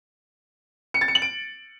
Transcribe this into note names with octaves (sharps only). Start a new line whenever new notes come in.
C#7
A6
C#7
F#7
D7